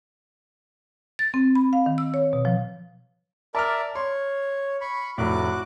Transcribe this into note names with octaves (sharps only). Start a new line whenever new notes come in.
A6
C4
B5
F5
D#3
E6
C#5
B2
F3
A#4 D5 E5 A5 F6
C#5 C6
B5 C#6
F1 A2 F#4 D6 F#6